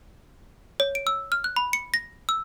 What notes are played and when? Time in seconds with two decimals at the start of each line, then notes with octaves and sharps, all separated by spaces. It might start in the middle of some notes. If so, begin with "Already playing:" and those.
0.80 C#5
0.95 D7
1.07 E6
1.32 F6
1.44 F#6
1.56 B5
1.73 C#7
1.94 A#6
2.29 E6